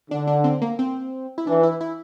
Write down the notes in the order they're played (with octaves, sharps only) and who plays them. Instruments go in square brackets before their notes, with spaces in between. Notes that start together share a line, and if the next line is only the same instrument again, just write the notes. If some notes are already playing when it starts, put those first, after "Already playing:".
[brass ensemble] D3 [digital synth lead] D4
[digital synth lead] D4
C4
A#3
C4
E4
[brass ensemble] E3 [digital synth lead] D4
[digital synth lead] E4
E4